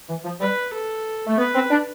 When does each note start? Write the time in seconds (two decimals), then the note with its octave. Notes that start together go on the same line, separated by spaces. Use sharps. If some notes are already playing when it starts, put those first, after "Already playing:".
0.09 E3
0.25 F3
0.41 G3 B4
0.73 A4
1.27 A3
1.37 B3 B4
1.54 C4
1.71 D4